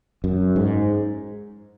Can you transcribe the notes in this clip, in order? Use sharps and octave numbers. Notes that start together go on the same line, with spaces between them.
F#2
G#2